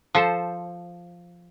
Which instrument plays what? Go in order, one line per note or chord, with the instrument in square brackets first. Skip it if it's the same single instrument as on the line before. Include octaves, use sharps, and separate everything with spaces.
[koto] F3 A4 C5